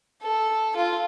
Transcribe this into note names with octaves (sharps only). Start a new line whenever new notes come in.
A4
F4